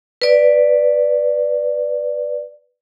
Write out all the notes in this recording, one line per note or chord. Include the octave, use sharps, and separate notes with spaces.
B4 D5